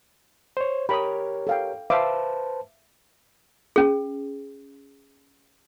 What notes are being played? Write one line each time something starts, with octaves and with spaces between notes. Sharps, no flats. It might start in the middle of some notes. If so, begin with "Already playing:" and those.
C5 C#5
G4 A#4 C#5 B5 D#6
A4 F5 G5
B4 C5 E5 F5 A5 D6
C#4 G#4